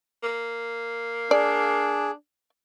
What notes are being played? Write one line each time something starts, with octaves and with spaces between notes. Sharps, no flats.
A#3
D4 G#4 D5